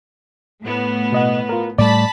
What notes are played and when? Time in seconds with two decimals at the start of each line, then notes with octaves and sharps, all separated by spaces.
0.62 A2 B3
1.12 B2 D#5 F#5
1.49 F4 A#4
1.78 A2 G3 A3 D5 A5 B5